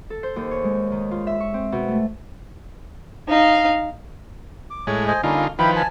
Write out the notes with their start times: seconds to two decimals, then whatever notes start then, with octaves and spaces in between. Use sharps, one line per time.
0.10 A4
0.23 C5
0.36 D#2
0.51 C#5
0.64 G#3
0.92 D#3
1.11 F4
1.27 E5
1.40 C#6
1.54 C4
1.72 B2
1.88 A3
3.28 D#4 F5
4.70 D6
4.87 A2 G#3 C#5
5.08 C5 D#5 G#5
5.23 D3 G3 A#3 C#4 D#4 F4
5.59 D#3 F3 E4 B4 G5 B5
5.76 G#5 A5